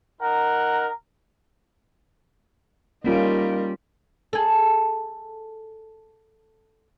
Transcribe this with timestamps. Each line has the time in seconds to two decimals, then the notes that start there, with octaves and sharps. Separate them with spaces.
0.21 D#4 A#4 F#5
3.04 G3 A#3 C#4 D#4 F4 A#4
4.33 G#4 A4